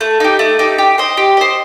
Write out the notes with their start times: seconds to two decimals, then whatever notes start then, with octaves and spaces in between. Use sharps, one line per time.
0.01 A3
0.20 D#4 G4
0.39 A3
0.59 D#4 G4
0.78 G4
0.98 C5 D#5
1.17 G4
1.37 C5 D#5